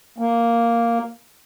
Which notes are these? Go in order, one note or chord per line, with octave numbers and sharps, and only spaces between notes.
A#3